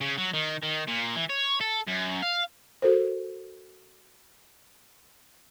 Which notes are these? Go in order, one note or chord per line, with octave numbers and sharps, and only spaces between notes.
C#3
F#3
D#3
D#3
A#2
E3
C#5
A4
F#2
F5
F#4 A4 A#4 C5